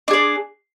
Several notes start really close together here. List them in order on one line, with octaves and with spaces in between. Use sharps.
D4 G#4 D5